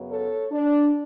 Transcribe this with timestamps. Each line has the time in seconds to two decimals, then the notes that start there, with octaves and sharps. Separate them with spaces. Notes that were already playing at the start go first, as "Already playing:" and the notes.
Already playing: F#2 C#3 F#3 B3
0.10 A4 C#5
0.52 D4